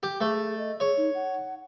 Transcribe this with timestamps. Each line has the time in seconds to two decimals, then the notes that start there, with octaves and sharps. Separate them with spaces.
0.03 G4
0.21 A3 G#4
0.58 D#5
0.80 G#4 C#5
0.97 D#4
1.15 F#5